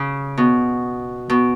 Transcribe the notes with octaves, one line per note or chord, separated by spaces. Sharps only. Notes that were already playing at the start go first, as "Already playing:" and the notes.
Already playing: C#3
B2
B2